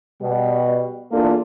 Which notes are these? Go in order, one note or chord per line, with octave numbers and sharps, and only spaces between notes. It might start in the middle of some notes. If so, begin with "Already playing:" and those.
B2 G3
E2 A#3 D4 F4 G#4 A4